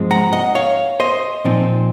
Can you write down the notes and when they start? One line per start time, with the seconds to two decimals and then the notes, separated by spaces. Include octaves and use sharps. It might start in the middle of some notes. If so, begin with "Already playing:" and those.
Already playing: G#2 F3 G#3 C4
0.11 F#5 A#5
0.33 D#5 F#5
0.55 C#5 F5
1.00 C5 D#5
1.45 A#2 F3 C4 D#4